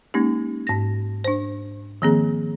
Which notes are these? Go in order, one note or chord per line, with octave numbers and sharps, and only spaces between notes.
G#3 A#3 C#4 D#4 G4
G#2 A#6
D4 C5
D#3 F3 A#3 C4 G#4